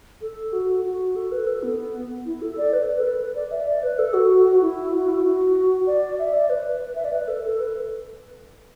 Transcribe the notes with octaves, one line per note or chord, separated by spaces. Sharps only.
A4
F#4
F#4
A4
B4
A4
B3
E4
A4
D5
B4
A4
B4
D5
E5
D5
B4
A4
F#4
E4
F#4
E4
F#4
D5
E5
D5
B4
E5
D5
B4
A4
A4
B4